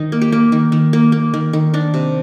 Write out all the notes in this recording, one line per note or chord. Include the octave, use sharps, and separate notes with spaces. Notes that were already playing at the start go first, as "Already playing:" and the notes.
Already playing: D#3 D#4
A#3
G4
A#3
D#3
D#3
A#3
A#3
D#3
D#3
D#3 D4
C3